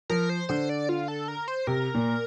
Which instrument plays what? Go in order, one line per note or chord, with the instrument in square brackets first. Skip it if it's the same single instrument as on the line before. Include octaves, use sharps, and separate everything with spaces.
[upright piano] F3 [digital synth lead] A#4
[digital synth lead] C5
[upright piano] D3 [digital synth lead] C5
[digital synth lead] D5
F4
A4
A#4
C5
[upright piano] C3 [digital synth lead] A#4
[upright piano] A#2